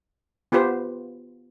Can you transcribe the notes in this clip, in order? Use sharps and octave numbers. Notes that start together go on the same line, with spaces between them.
B3 F4 G4 B4 C5